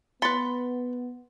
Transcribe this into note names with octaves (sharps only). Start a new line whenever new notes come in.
B3 B4 B5 C6 A6 C#7